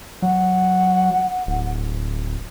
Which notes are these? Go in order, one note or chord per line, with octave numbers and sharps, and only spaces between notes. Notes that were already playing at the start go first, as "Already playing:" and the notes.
F#3 F#5
D1